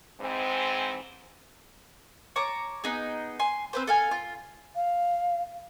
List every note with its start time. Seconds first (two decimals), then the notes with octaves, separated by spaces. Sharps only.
0.20 G#2 E3 G#3 C4
2.36 C#5 A5 A#5 D6
2.84 B3 D#4 G#4
3.39 G#5 C6
3.73 C4 B4 C5
3.87 A4 F5 G#5
4.11 F4
4.76 F5